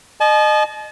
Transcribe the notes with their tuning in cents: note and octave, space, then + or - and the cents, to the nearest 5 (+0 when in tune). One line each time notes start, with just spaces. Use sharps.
D#5 -30 A5 -40